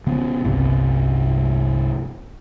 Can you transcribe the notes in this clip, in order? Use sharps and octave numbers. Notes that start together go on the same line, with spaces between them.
C#3 B3
G1 C2 C3